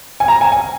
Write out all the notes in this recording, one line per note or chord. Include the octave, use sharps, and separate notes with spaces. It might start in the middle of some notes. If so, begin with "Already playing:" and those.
G#5
A#5
G#5
G#5